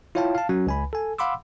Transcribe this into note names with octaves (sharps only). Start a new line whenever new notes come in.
E4 F4 C#5 F5 G5 A5
F5 A5
F#3 C#4 F#4
C#2 G#5 B5
A4 G#5
F5 F#5 B5 C6 D6 E6